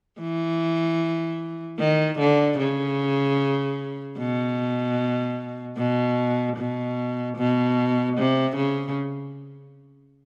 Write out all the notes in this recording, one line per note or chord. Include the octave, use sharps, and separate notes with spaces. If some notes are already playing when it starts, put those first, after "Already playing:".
E3
D#3
D3
C#3
B2
B2
B2
B2
C3
C#3